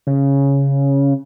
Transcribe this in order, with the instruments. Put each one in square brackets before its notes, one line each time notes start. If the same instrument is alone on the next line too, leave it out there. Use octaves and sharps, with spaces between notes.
[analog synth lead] C#3